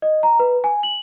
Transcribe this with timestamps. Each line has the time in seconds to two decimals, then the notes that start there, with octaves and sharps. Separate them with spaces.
0.02 D#5
0.23 A#5
0.39 B4
0.64 G#5
0.83 F#7